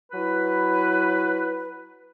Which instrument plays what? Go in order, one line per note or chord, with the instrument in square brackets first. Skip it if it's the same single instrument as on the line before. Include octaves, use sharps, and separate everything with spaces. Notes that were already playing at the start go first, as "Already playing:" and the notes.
[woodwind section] F#3 E4 B4